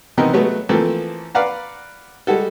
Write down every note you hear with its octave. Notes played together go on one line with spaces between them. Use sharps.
C3 E3 B3 C4 D#4 A#4
F#3 G#3 A3 B3
E3 F3 A3 A#3 C4 A4
B4 D5 F5 F#5 A#5
G3 G#3 F#4 A4